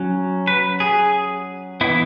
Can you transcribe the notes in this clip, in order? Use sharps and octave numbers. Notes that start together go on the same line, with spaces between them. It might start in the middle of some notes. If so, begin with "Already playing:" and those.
Already playing: F#3 C#4
B4
G#4
E3 B3 E4